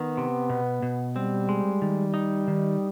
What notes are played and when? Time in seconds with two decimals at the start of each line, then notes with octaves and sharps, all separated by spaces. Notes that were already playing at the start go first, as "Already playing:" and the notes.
Already playing: D#3 B3
0.17 C3
0.49 B2
0.82 B2
1.16 G3 C4
1.49 G#3
1.82 D#3
2.14 D#4
2.48 D#3